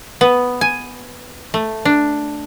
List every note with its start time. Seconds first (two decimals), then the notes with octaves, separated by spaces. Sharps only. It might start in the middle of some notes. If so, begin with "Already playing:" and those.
0.21 B3
0.61 G#5
1.54 A3
1.85 D4